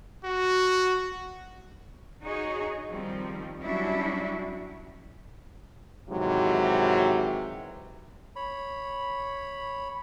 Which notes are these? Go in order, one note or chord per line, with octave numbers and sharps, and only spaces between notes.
F#4
D#4 F#4 G#4 C#5 D#5
D#3 F3 G3 C4
F#3 G3 C#4 D4 E4 F#4
G#2 C3 D#3 E3 F#3
C#5 B5